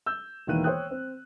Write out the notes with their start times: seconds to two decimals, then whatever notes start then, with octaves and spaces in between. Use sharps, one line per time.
0.06 E6 G6
0.47 E1 D#3 E3 A#3 F#6 D#7
0.64 C5 C#5 G5 D#6 F#6
0.91 C4